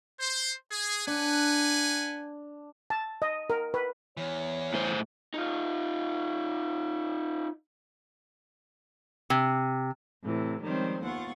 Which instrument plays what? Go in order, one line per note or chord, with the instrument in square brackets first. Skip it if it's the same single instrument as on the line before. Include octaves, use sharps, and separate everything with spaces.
[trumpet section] C5
G#4
[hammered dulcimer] D4 [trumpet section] B4 F#5 G#5
[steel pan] A5
D#5
A#4
B4
[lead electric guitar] E2 E3 [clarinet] C#5
[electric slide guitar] A2 C5
[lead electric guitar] D#4 F4
[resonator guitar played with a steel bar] C3
[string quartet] A2 C3 E3
D#3 F3 G3 G#3 C4 C#4
D#2 B3 F4 F#5 C#6 A6